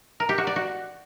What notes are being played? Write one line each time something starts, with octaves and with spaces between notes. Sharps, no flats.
A#4
G4
F#4
D5
F#4